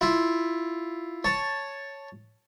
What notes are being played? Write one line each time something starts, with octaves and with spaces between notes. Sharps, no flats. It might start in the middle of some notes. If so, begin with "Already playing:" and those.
E4 F4
C#5 A5